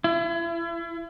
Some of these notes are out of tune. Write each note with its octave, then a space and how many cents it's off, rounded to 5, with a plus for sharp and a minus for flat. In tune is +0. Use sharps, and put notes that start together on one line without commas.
E4 +35